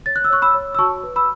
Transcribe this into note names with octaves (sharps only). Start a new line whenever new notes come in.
C#5 A6
F#6
E6
C#5 C#6 F#6
B5 E6
C#5
E6
F#4 A5 C#6
B4
B5 E6